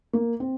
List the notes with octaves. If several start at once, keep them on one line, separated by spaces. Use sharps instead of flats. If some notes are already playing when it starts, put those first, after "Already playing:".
A#3
C4